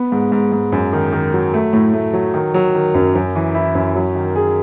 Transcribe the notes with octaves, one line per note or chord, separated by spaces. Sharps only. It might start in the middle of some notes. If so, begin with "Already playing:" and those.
Already playing: B3
G#2
G#2
G#2
F#2
D#3
D#3
F#3
A3
A2
A3
F#3
D#3
F#3
D#3
F#2
F#2
E3
E4
F#2
F#3
D#3
G#4